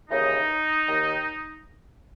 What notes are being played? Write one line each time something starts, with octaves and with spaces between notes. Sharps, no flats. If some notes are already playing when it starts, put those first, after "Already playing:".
D#2 C#3 E3 D#4
D#2 D#3